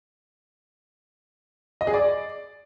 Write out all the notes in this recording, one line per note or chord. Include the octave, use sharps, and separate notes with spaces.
D#5
G#4
D5